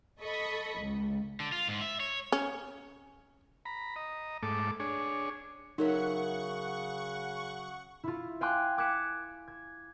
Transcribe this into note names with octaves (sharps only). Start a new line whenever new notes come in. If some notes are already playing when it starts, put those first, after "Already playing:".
A4 D#5 B5 C#6
C#2
D3
F4
G#2
E5
C#5
C#4
A#5 B5
D#5 A#5
G#2 A3 A4 D6
D4 G#4 C#5
C#3 F#3 D#4 A#4 E5 F#5 C#6
E4 F4
F5 G5 G#5 C6 D6 F#6
D6 F#6 G#6 B6 C#7 E7
G#6